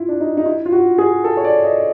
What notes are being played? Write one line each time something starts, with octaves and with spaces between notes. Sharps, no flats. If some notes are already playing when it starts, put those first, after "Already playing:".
Already playing: E4 F4
D4
D#4
D#4
E4
F4
F#4
G#4
A4
C#5
D5
D#5